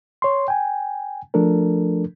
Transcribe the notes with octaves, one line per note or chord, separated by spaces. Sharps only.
C#5 C6
G5 G#5
F3 A3 D4 A4 A#4